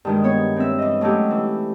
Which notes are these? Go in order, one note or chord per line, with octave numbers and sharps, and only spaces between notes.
G2 D#3 G#3
B3 C#5
C4 E5
E3 D#5
F#3 A3 C#4 D#4 G4
E3